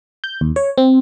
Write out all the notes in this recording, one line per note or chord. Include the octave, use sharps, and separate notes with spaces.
G6
D#2
C#5
C4